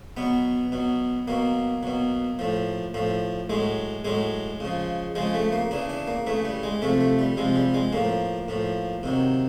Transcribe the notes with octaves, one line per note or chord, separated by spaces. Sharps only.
B2 F#3 B3
B2 F#3
B2 F#3 A#3
B2 F#3
A2 F3
A2 F3
A2 F#3 G#3
A2 F#3 G#3
C#3 F3
C#3 F3 G#3
A3
A#3
C#3 E3 D4
D4
A#3
C#3 E3 A3
G3
G#3
C3 F3 A3
A3
G3
C3 F3 G#3
G3
G#3
A2 F3 A#3
A2 F3
C3 D#3 F#3